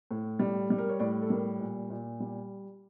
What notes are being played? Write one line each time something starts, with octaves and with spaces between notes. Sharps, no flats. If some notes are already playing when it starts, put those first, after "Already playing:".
A2
G3
G3
A#4
C#5
A2 D5
A4
G3 A#4
A#2
A#2
G3